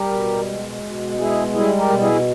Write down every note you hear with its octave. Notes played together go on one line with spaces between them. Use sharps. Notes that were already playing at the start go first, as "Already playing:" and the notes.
Already playing: G3 G4 A#4
B2
G#3
B2
G#3 E4 G#4
G3 E4 G#4
G4 A#4
B2
E4 G#4